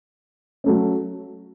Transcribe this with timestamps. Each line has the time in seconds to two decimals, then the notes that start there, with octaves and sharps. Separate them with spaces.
0.64 F#3 A3 C#4